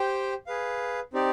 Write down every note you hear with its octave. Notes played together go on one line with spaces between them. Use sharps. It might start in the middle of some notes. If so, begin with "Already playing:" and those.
Already playing: G4 C5 G5
G#4 B4 F5
C4 D#4 G4 D5